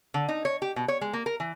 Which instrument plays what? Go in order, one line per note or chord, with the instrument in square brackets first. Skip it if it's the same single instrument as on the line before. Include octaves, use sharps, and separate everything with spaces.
[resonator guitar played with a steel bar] D3
D#4
C#5
G4
B2
C#5
G#3
A#3
A#4
E3